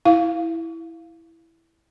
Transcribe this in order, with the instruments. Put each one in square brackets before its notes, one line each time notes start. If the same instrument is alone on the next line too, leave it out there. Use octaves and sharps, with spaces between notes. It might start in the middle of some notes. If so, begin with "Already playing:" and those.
[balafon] E4 F5